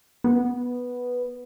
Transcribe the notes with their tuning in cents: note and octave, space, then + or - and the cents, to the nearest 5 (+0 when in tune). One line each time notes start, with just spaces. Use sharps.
B3 -5